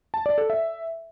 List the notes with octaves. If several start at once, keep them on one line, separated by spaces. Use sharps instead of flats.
A5
D5
A4
E5